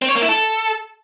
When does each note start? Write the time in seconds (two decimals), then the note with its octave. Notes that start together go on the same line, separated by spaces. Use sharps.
0.02 C4
0.09 C#5
0.15 A#3
0.22 E4
0.29 A4